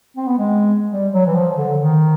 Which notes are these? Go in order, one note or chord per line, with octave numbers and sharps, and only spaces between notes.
C4
B3
G#3
G3
F#3
E3
F3
D3
D#3